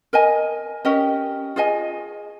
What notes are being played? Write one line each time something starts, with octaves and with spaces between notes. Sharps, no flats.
A#4 D#5 G#5
C#4 G4 A#4 D#5
F4 G#4 D#5 G#5